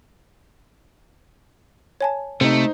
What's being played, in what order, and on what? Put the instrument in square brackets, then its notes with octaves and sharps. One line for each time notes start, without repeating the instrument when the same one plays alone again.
[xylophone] C#5 G#5 A5
[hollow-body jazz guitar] C3 [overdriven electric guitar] A3 [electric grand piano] D#4 C5